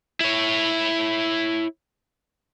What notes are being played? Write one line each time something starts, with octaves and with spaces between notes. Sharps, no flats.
E4 C#5